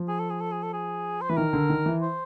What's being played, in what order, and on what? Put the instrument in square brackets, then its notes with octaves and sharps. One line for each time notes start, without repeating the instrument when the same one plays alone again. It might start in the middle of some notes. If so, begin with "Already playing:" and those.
Already playing: [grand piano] F3
[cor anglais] G#4
A4
G#4
A4
G#4
A4
G#4
C5
[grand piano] E3 [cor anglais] B4
[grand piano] D#3 [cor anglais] A#4
[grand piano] D3
D#3
E3
[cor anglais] C5